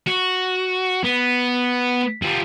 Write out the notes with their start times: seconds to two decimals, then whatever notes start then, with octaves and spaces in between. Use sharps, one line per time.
0.07 F#4
1.04 B3
2.22 G3 F4